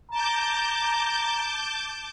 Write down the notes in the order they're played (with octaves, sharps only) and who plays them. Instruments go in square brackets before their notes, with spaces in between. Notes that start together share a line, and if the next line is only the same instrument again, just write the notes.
[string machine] A5 D6 G6 [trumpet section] A#5